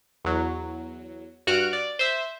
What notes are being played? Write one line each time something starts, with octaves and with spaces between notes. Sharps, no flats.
E2 F#3
G2 F#4 F6 F#6 D7
D5
C5 E5